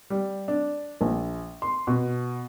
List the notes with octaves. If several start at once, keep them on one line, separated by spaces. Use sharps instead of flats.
G3
D4
A#1
C6
B2